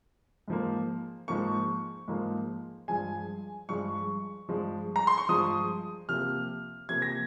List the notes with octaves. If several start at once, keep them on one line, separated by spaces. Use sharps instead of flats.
G#2 F3 A#3
G#2 F3 A#3 C#6
G#2 F3 A#3
G2 F3 G#3 G#5
G2 F3 G#3 C#6
G2 F3 G#3
A#5
C6
C#6
G2 F3 G#3 D#6
C3 F3 A#3 F6
C3 F3 A#3 G#6
A#6